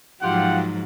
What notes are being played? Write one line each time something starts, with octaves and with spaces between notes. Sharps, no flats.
G#2 F3 F#3 F4 G4 F#5